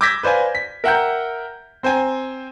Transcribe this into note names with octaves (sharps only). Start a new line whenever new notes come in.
D6 E6 G6 G#6 A#6 B6
B4 C5 D5 F5 G#5
B6
A#4 E5 F#5 G5 A#5 G6
C4 C5 G5 G#5 A#5